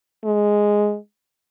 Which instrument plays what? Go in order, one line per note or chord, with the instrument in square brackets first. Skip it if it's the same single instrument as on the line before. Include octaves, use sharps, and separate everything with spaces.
[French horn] G#3